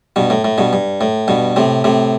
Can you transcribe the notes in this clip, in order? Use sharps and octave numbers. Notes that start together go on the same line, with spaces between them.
G2 B2
A2
A2
G2 B2
G2
A2
G2 B2
A2 C3
A2 C3